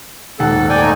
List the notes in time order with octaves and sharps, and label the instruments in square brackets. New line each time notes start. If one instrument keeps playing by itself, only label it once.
[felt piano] D#1 G#2 F#5 [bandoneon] A4
[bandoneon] D5 G5 G#5
A3 D#4 G#5